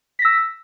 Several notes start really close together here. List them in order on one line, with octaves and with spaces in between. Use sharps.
B6 A#6 E6